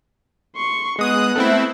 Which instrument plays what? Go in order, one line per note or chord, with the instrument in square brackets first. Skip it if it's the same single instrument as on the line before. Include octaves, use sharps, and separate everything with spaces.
[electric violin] C6 C#6
[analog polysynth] G#3 D#6 [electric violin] B3 F#6
[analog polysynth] A3 C4 E4